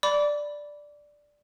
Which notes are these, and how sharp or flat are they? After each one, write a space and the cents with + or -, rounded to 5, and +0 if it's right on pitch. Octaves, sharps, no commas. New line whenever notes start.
D5 +0 B5 +0 D6 -30